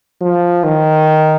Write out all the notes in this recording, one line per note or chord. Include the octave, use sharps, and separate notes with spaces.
F3
D#3